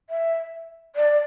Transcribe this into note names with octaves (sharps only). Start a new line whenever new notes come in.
E5
D5